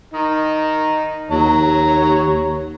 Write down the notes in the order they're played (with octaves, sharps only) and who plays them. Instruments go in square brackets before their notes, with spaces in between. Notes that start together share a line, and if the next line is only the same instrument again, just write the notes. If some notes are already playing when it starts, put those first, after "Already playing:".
[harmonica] D#3 D#4
[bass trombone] D#2 [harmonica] C#5 A#5